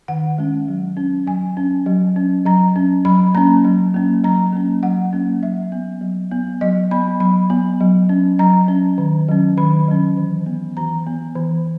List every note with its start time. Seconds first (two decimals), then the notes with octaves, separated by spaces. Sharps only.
0.08 D#3 F#5
0.38 G#3 C#4
0.68 F#3
0.97 C#4
1.26 F#3 G#5
1.57 C#4
1.86 F#3
2.16 C#4
2.46 F#3 A#5
2.76 C#4
3.05 F#3 B5
3.34 A#3 C#4 A#5
3.65 F#3
3.94 A#3 C#4
4.24 F#3 A#5
4.53 A#3 C#4
4.83 F#3 F#5
5.13 A#3 C#4
5.43 F#3 E5
5.72 B3
6.01 F#3
6.31 B3
6.61 F#3 D#5
6.91 B3 B5
7.20 F#3 B5
7.50 B3
7.80 F#3
8.09 C#4
8.39 F#3 A#5
8.68 C#4
8.98 D#3
9.28 F#3 C#4
9.57 D#3 B5
9.88 F#3 C#4
10.17 E3
10.46 B3
10.77 E3 A#5
11.07 B3
11.36 E3